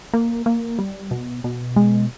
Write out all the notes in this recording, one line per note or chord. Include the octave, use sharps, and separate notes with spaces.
A#3
A#3
G3
B2
B2
G#3